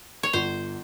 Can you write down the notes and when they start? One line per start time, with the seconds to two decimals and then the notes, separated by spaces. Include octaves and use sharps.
0.23 C#5
0.33 G1 C5